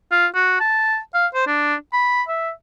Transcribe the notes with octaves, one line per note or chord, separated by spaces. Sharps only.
F4
F#4
A5
F5
C5
D4
B5
E5